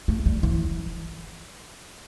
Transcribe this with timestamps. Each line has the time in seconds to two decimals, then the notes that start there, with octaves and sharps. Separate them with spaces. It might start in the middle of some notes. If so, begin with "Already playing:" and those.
0.08 A3
0.26 G3
0.43 E3